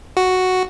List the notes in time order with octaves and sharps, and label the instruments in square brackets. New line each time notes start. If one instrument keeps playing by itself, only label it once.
[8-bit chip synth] F#4